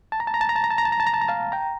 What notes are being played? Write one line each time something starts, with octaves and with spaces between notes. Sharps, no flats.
A5
A#5
A5
A#5
A5
A#5
A5
A#5
A5
A#5
A5
A#5
A5
A#5
A5
A#5
F5 A5
G5 A#5